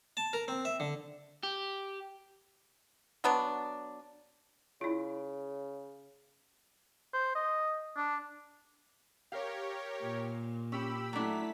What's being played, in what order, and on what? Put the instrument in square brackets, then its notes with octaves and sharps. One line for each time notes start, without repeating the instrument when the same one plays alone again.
[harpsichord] A5
A#4
C4
E5
D3
[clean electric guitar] G4
[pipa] F#3 B3 D4
[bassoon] C#3 [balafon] E4 F4
[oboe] C5
D#5
D4
[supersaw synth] G4 A#4 C#5 [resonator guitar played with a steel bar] F5
[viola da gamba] A#2
[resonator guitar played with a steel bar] C#4 [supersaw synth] G4 B5 E6
[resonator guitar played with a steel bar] F#3 D4 [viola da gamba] A3 E4 [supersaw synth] B6